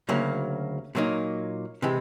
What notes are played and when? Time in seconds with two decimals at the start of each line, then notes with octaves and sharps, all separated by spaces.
0.09 D2 C#3 F#3 A#3
0.95 A#2 F#3 A#3 D#4
1.82 C3 E3 G#3